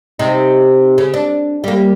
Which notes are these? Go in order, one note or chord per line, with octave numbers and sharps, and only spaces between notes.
C3 D#4
C#3
D4
G3 A#3